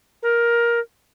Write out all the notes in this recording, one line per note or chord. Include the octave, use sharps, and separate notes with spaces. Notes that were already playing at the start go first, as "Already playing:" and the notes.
A#4